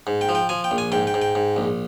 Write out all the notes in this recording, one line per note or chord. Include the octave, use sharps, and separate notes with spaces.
G#2
G5
F3
G5
F3 G#5
G5
A#1
G#5
G#2 G5
G5
G#2
G5
G#2
A#1